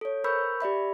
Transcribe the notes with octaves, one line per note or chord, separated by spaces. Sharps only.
A4 C#5
A#4 C5 B5 C#6 E6 G6
G4 D5 E5 B5